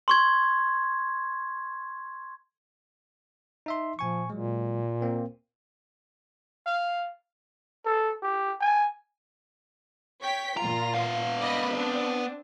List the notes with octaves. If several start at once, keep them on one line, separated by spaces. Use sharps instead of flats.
C6 C#6 G#6
D#4 E5 C6
A#2 F3 G#5 C#6
A#2 F#3 G#3
A#3 C4 A#4
F5
A4
G4
G#5
C#5 G5 B6
A#2 F4 A#5
B3 F5
D5 D#5 B5
C4 D4